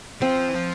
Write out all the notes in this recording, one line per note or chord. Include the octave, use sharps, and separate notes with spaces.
F3 C4
E3
F3